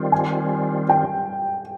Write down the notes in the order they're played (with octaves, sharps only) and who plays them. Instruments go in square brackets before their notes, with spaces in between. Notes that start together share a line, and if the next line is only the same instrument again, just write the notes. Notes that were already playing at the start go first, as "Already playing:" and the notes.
Already playing: [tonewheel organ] D#3 G3 C4 F4
[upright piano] G#5
G5